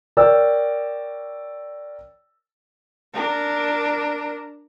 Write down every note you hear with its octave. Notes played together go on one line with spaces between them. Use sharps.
A#4 C#5 D5 G5 E6
D4 A#4